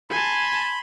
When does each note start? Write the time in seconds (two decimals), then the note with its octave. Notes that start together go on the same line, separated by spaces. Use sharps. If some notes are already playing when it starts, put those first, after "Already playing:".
0.10 G#5 A5 B5 C6